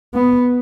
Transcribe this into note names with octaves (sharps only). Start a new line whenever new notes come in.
B3